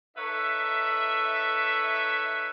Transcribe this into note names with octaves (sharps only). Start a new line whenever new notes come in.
D#4 A4 B4 C#5 E5